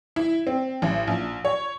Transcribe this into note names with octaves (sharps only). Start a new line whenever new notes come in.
E4
C4
A1
A#1
C#5